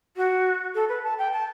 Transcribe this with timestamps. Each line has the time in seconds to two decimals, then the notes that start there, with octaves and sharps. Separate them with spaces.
0.17 F#4
0.75 A4
0.89 B4
1.04 A5
1.18 G5
1.33 A5